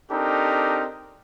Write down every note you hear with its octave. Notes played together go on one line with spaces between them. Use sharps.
C4 D4 D#4 G4 A4 A#4